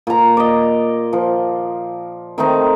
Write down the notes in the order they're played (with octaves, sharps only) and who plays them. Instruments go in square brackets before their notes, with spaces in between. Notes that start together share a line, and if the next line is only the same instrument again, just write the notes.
[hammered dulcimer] A#2 A#5
D5 D#5
F3
D#3 A3 C4 D#4